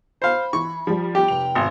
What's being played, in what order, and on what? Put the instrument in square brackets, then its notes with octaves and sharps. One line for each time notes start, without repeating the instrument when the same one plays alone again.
[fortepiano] C5 F5 [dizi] B5
[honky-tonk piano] E3 [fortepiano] C#6
[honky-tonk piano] F3 G3
[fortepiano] G4 [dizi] G5
[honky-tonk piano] F1 F7
[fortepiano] G#1